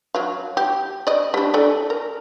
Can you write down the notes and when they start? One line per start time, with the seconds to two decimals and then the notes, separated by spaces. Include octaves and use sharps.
0.15 F#3 F5
0.57 G4
1.07 D5 D#5
1.34 G3 D4
1.54 A4 D5 G#5
1.90 A#4